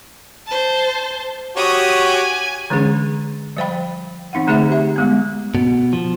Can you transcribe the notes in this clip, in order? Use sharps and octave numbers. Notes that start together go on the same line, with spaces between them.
C5 A5
F#4 G4 C#5 D#6
G#5
D3 E3 G#3 C#4 D4 G#4
F3 G3 C5 F5 G5 B5
E3 C4 D#4 F5 F#5
D3 A3 D#4 G#4 C5 E5
G4 E5
G3 G#3 B3
B2
F3